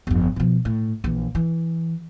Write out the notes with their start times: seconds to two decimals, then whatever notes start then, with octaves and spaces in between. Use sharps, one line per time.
0.07 G1 F2
0.36 B2 F3
0.65 A2
1.04 A#1 E3
1.35 E3